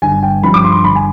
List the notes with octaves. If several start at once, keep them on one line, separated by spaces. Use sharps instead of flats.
G1 G#5
G5
G2 F3 B5
D6
C6
G1 B5
G#5